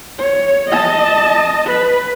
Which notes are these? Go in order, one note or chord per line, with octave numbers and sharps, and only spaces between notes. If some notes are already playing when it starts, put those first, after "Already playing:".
C#5
D#5 A5
B4